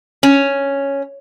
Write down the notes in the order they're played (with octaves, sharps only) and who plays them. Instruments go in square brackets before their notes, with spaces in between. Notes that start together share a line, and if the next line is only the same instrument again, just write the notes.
[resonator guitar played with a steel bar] C#4